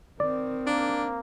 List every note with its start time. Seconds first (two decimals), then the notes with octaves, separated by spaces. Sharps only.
0.20 D#3 C4 D5
0.67 A#3 D4